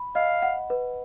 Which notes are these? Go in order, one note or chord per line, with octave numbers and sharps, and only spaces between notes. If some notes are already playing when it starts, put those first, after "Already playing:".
Already playing: B5
D#5 F5
F#5
B4